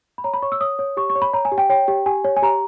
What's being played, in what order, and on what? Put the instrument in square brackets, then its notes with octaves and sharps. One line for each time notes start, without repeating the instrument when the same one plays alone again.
[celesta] B5
C#5 A#5
B5
C#5 C#6
E6
C#5 D#6
C#5
G4 C#6
C#6
C#5
B5
C#5 A#5
G#5
G4
G5
C#5 G5
G4
G4 G#5
C#5
G#5
G4 A#5